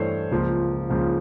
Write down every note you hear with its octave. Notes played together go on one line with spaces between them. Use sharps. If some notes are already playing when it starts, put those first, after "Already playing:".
Already playing: G2 E3 A3 C5 C#5
C#2 C#3 F3 A#3
C#2 C#3 F3 A#3